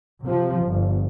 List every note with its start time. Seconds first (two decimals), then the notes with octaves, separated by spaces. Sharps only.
0.24 C3 F3
0.65 G1